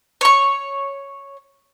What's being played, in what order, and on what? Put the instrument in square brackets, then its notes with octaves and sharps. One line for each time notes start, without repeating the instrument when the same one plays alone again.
[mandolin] C#5 C#6